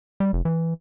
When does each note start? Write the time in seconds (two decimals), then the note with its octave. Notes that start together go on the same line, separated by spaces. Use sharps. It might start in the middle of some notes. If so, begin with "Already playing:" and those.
0.20 G3
0.33 F1
0.45 E3